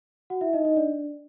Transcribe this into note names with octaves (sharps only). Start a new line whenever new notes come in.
F#4 F#5
E4 E5
D#4 D#5
D#4 D#5
D4 D5